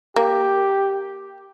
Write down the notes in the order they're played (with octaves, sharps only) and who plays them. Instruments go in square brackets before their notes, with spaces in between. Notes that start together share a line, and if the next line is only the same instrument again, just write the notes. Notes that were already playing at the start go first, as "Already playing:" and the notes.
[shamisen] A#3 [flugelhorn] G4